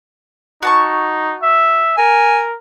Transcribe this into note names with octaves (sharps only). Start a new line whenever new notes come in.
D#4 F#4 A5 C#6
E5
A#4 G#5